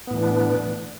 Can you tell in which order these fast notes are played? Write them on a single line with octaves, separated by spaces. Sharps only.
B3 A2 E3 D4